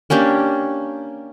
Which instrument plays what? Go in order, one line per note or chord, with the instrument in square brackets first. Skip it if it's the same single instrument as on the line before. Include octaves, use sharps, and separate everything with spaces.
[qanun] A#3 C#4 D4 G4